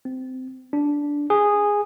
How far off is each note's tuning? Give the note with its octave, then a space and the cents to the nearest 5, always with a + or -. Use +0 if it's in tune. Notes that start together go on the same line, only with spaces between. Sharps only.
C4 -20
D4 -10
G#4 -10